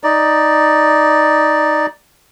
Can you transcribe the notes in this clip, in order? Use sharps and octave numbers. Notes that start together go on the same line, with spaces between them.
D#4 D5